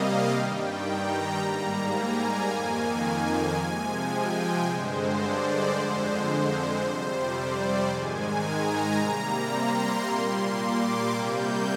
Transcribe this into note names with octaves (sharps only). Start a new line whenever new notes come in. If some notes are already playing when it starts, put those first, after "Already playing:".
Already playing: C3 G3 A#3 D#5 F5
G2 D#3 G3 G5
A#5
G#2 G3 A#3 A#5
G#5
F2 D#3 A#3
G#5
C3 F3 G#3 G#5
G5
G2 D3 G#3 C5
D5
F2 D3 G#3 C5
C5
F2 C3 G3
D5
G#2 D#3 G#3 G#5
A#5
C3 G3 A#3
C6
A#2 G3 A#3
D6
C3 G3 A#3 G6